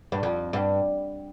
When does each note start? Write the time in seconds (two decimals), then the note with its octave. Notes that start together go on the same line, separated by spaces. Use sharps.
0.12 G2
0.23 F2
0.53 G2